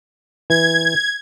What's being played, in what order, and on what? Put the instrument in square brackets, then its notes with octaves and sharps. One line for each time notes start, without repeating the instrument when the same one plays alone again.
[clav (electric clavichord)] E3 [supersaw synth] G#6